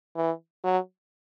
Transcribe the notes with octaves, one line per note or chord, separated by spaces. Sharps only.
E3
F#3